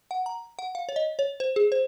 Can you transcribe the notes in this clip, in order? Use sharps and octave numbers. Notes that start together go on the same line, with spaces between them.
F#5
A#5
F#5
F5
C#5
D#5
C#5
C5
G#4
C5